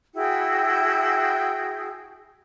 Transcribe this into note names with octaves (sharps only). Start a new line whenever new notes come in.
E4 F#4 G#4 G5